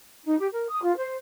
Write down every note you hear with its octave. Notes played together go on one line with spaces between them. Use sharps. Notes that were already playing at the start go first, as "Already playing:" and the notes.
D#4
G4
A#4
D#6
F4
C5